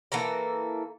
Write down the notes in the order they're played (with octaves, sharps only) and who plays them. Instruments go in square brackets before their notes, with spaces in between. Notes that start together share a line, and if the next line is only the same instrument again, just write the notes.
[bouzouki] E3 A#3 A4 A#5